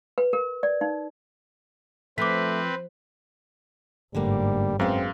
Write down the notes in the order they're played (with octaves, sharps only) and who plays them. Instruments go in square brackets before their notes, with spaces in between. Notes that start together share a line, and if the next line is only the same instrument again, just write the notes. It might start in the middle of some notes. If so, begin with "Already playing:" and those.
[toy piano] B4
A#4
D5
D#4
[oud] F3 [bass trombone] A3 [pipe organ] C4 B4 [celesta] D6 B6
[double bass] G1 G#2 [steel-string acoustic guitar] D3 A3 A#3 [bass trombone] G3
[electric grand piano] F#2 F5 [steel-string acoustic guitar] G#3 B3 [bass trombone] C4